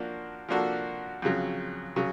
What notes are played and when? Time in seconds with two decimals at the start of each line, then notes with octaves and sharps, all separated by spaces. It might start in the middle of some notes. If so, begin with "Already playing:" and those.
Already playing: F3 A#3 D4 F#4
0.49 F3 A#3 D4 F#4 A4
1.22 F2 C#3 F#3
1.96 C#3 F#3